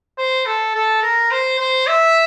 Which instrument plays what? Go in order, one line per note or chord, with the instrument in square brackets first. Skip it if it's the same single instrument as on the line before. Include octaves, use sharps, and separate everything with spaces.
[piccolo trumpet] C5
A4
A4
A#4
C5
C5
E5